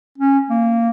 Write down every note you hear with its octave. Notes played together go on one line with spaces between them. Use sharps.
C#4
A#3